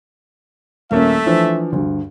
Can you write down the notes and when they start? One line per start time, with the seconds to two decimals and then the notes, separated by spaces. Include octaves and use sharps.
0.91 D#1 A3 A#3 C#4 E5
1.26 E3 F3 D4
1.72 D2 G2